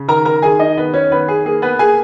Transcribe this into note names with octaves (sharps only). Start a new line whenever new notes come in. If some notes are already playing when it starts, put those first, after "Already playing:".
Already playing: C#3
D#3 A#4 A#5
A#4 A#5
D#3 G#4 G#5
D#4 D#5
D#3 B3 B4
C#4 C#5
D#3 B3 B4
G#4
A#3 G#4
B3 B4
A#3 G#4 G#5